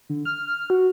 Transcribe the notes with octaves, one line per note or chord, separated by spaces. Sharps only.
D3
F6
F#4